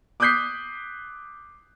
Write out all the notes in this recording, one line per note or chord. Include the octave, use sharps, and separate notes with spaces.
D6 D#6 F#6 G6 B6 C7